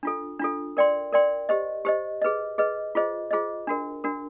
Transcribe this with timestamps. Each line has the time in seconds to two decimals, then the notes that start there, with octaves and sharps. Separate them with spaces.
0.03 D4 F4 A4
0.39 D4 F4 A4
0.77 A#4 D5 G5 C6
1.13 A#4 D5 G5 C6
1.49 G4 C5 D#5
1.85 G4 C5 D#5
2.22 G#4 B4 D#5
2.58 G#4 B4 D#5
2.95 F4 G#4 C5 D#5
3.31 F4 G#4 C5 D#5
3.67 D4 F#4 A#4
4.04 D4 F#4 A#4